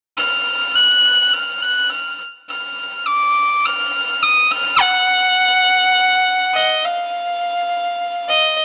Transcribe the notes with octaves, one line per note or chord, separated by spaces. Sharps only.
F6
F#6
F6
F#6
F6
F6
D6
F6
D#6
F6
F#5
D#5
F5
D#5